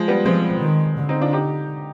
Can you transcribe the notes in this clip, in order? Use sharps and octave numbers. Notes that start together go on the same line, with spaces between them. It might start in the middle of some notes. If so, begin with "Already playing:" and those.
Already playing: F3 G#3
G3 B3
F3 G#3 C4
D#3
D3
C4 D#4
D4 F4
D#4 G4